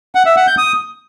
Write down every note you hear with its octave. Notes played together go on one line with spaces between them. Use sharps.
F#5
E5
F#5
G6
D#6